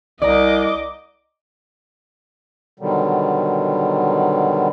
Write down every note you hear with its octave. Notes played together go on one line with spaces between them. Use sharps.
C2 D5 D#5 A#5 D6
B2 D3 D#3 F#3 G3